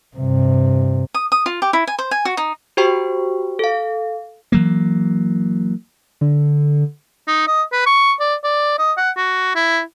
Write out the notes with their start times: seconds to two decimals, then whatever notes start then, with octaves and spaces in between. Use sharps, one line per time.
0.16 G2 C3
1.14 D#6
1.32 D#6
1.46 F4
1.62 G4
1.73 E4
1.87 G#5
1.99 C5
2.11 G#5
2.25 F#4
2.37 D#4
2.77 F#4 G4 C5 G5 C#6
3.59 A4 F5
4.52 E3 F#3 A#3
6.21 D3
7.27 D#4
7.47 D#5
7.72 B4
7.86 C#6
8.20 D5
8.44 D5
8.79 D#5
8.98 F#5
9.17 F#4
9.55 E4